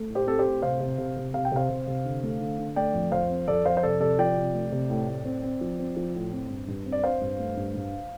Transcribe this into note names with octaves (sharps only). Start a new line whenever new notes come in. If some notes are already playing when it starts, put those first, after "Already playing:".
Already playing: A3
A2
G4 C5
C4 A4
G4 C5
A2
C3 C5 F5
C3
C3
C3
C3 F5
G5
C3 C5 F5
C3
C3
D3
A3
D3
D3
A3 D5 G5
F2
F2 C5 F5
C4
F2 A4 D5
F2 C5 F5
C5
C3 A4 D5
C3 A4 D5
F3 D5 G5
C3
A3
C3
A2
A2
C4
C4
F3
C4
F3
A2
C4
G2
G2
C4
D5
C4 C5 F5
G2
A3
G2
G2